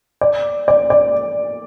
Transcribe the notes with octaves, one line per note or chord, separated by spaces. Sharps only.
D5
D5
D5